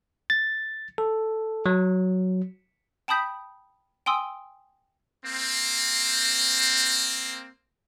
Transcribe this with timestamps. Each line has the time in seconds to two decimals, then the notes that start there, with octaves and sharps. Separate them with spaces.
0.30 A6
0.98 A4
1.66 F#3
3.08 G5 A5 B5 D#6 G6 B6
4.06 G5 G#5 C6 D#6 E6
5.26 A#3 C4